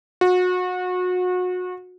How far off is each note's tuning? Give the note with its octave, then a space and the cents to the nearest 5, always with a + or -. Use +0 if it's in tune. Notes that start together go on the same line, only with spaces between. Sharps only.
F#4 -30